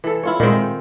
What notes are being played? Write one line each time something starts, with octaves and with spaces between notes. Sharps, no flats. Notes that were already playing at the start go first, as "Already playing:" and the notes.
E3 A4
E4 F4 C#5
A#2 D#3 G#3 C4